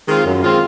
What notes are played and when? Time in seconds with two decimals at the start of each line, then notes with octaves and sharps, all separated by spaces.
0.08 D#3 G#3 C4 F4
0.25 F#2
0.43 D#3 G#3 C4 F4